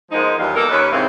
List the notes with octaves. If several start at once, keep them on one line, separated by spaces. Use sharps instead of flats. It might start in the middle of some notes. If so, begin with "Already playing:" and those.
F3 G#3 A#3 B3 D#4
E2 D#3 F#3 G3 F5
A#3 D#4 A4 A#4
D#2 C#4 B4
G#2 C3 E3 A#3 C4